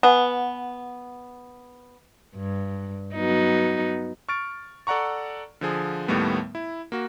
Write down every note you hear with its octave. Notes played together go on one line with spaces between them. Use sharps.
B3 F#5 G#5
G2
F#3 B3 D#4
C#6 F6 A6 D7
A4 D5 F#5 A#5 C#6
D3 F3 G#4
D#2 A2 D#3 G3 A3 B3
E4
A#3 F#4